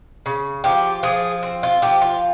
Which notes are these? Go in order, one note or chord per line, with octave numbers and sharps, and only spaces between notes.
C#3
F3 G4
F3 G#4
C4
F4
F3 G4
F4